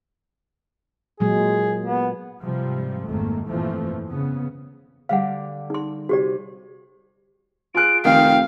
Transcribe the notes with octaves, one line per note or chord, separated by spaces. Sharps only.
A#2 F#3 G#3 G#4
B3
G#2 C3 F3 G3
G#1 F2 G#2 D#3 A3 A#3
G1 F2 A#2 E3 F3 A3
C#3 B3
D3 G3 F5 F#5
D#4 C6
C3 F#4 G4 D5
F4 G#4 F#6 D7
F1 D#3 F5 G5